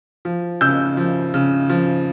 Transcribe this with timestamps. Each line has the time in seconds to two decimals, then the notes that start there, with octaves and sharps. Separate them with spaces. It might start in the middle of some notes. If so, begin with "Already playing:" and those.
0.25 F3
0.61 C#3 E6 G6
0.97 F3
1.34 C#3
1.69 F3